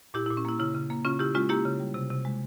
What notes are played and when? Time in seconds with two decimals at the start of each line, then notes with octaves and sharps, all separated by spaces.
0.14 A#2 E4 G4
0.26 E4
0.30 A#2
0.37 C#4
0.45 A#3 E4
0.59 C#3 E4
0.74 C#3
0.90 A#3
1.05 C#3 C#4 F4
1.19 C#3 E4 G4
1.35 G#3 C#4 F4
1.49 A#3 E4 G4
1.65 C#3
1.80 G3
1.94 C3
2.10 C3
2.25 G#3